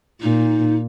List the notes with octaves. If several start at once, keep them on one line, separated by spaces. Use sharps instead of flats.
A#2 D#4